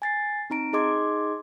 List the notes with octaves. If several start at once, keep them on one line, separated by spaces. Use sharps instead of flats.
G#5 A6 C7
C4 D#4 A#5 D7
D#4 G#4 D#5 C6 D6 G#6